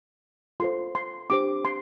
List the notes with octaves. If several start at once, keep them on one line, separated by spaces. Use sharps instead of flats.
F4 A4 C5 C6
C6
D4 G4 C5 D6
C6